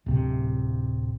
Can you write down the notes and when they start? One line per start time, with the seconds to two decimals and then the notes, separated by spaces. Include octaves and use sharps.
0.06 D1 C3